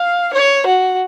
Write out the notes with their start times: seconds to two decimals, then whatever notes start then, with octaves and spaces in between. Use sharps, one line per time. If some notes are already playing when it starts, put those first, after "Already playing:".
Already playing: F5
0.34 C#5
0.67 F#4